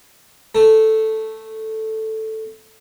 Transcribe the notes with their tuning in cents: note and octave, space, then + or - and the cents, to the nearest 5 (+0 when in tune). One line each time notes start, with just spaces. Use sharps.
A3 +0 A4 +0